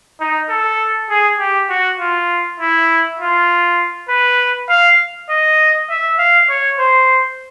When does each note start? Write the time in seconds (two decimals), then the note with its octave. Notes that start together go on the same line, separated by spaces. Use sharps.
0.20 D#4
0.49 A4
1.10 G#4
1.39 G4
1.69 F#4
2.00 F4
2.60 E4
3.20 F4
4.09 B4
4.69 F5
5.30 D#5
5.89 E5
6.19 F5
6.49 C#5
6.79 C5